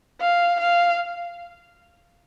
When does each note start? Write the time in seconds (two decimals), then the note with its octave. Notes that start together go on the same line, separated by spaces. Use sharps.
0.21 F5
0.60 F5